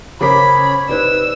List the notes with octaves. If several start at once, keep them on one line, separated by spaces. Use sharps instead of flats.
C#3 C#4 A#4 C5 C#5 B5 D6 B6
C3 D#4 B4 C5 D5 E6